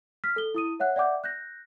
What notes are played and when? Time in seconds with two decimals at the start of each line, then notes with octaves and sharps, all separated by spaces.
0.24 F6 B6
0.36 A4 G7
0.54 E4 D#6 D#7
0.80 C#5 E5 F#5 F#6
0.96 D5 E5 F#5 G5 D6 G6
1.24 F#6 G6 A#6